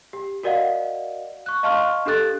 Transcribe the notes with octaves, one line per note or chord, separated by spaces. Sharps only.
G4
F#4 A#4 D5 D#5 F5 F#5
C#6 F#6
D#5 F5 A5 C6 C#6 F6
D4 G4 A4 F#6 A6